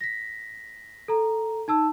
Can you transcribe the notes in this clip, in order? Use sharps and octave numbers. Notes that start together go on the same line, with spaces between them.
A#6 B6
A4 A#5
D#4 A5 E6